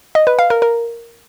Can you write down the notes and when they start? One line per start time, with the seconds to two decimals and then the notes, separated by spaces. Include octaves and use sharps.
0.15 D#5
0.27 B4
0.39 F5
0.50 A#4
0.62 A#4